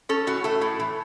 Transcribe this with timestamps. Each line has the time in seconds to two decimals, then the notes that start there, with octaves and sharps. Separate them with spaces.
0.09 C#4 A4
0.27 A2 F#4
0.44 A3 A4
0.61 A2
0.80 E3